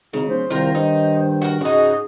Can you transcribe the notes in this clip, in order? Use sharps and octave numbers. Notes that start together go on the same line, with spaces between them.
G#1 C#3 D#4
D1 C5
C2 D#3 F4 A#4
G2 D#4 C5
F#4 A#4
G#2 C#3 D#4 F#4 G#4